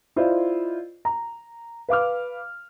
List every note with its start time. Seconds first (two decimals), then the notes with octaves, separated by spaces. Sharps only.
0.16 E4 F4 C5 D5 D#5
1.05 A#5
1.89 B4 F5 D6 F6